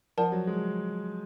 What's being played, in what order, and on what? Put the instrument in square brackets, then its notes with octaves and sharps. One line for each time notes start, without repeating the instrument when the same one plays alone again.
[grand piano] F3 [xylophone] A#4 D5 F#5 A5
[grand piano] F#3
G#3